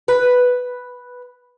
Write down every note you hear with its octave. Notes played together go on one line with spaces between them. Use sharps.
B4